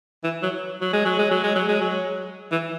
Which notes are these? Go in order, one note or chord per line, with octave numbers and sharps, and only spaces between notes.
E3
F#3
F#3
G#3
F#3
G#3
F#3
G#3
F#3
G#3
F#3
E3